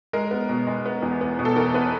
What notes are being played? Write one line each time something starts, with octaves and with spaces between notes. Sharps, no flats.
G#3 A#4
B3
B2
G#3
B3
E2
B3
B2
A4
E2 A#4
B3 B4